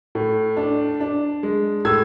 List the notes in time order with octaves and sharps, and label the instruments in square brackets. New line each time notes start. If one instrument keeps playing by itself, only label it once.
[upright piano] A2
D4
D4
G#3
A2 E6 G#6